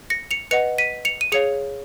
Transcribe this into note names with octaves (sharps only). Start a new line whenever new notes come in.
A#6 C#7
C#7 F7
B4 D#5 F#5 C#7 F7
B6 D#7
C#7 F7
D#7
G#4 C#5 F5 C#7 F7